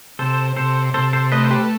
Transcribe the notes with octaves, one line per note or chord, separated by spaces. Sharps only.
C3 A4 C5
C3 A4 C5
C3 A4 C5
A4 C5
A3 B4 D#5
C5
G4 B4